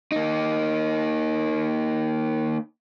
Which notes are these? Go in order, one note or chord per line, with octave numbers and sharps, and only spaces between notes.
A#3 D#4